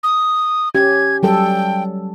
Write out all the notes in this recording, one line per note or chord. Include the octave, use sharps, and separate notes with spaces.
D#6
C#4 G4 G#6
F#3 G3 A4 G5